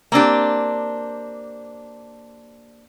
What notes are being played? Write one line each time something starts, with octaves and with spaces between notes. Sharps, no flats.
A#3 C4 D4 G4